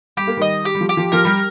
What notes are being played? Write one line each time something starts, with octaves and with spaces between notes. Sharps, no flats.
G3 G4
A#3
D#3 G3 D#5
G4
G3
F3
G4
F3
F3 A#4
G3